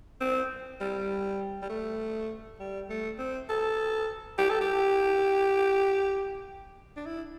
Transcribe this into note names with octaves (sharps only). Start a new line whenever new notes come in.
C4
G3
G3
A3
G3
A3
C4
A4
G4
A4
G4
D4
E4